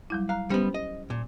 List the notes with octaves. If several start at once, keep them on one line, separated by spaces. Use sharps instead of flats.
F#3 G3 E4
F5 A#5 F#6
G3 B3 C#4 G4 C5
D#5
A#2